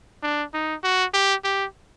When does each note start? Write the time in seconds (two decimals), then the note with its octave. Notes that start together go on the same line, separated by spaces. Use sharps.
0.23 D4
0.54 D#4
0.84 F#4
1.13 G4
1.44 G4